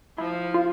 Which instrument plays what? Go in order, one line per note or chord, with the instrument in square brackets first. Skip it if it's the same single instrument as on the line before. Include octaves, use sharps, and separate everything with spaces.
[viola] F3 [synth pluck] E4
[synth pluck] F4